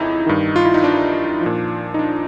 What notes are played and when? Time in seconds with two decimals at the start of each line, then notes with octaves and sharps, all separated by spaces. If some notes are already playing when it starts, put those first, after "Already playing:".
Already playing: F2 C#3 E3 D#4 E4
0.26 G2 D#3
0.56 F4
0.65 E4
0.74 D#4
0.84 D4
1.41 A#2 F3
1.94 D#4
1.99 D4